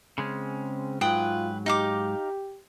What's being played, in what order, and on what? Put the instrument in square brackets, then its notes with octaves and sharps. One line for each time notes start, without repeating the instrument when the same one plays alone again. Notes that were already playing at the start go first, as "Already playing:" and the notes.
[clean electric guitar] C#3 G#3 C#4 [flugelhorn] C4
[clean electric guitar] G#2 F#3 [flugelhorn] F4 [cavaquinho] B4 G5 D#6
[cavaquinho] D#4 F5 D6 [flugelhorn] G4